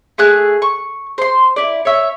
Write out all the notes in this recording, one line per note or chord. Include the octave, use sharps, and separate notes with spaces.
A3 G#4 F#6
C#6
C5 C6
E4 D5
C#5 E5